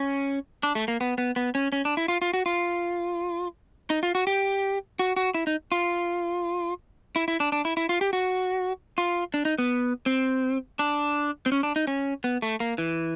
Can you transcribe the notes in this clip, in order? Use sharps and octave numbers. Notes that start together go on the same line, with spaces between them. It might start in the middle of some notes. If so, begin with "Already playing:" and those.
Already playing: C#4
D4
A3
A#3
B3
B3
B3
C#4
C#4
D4
E4
F4
F4
F#4
F4
D#4
F4
F#4
G4
F#4
F#4
E4
D#4
F4
E4
E4
D4
D4
E4
E4
F4
G4
F#4
F4
D4
D#4
B3
C4
D4
C4
C#4
D4
D#4
C#4
B3
A3
A#3
E3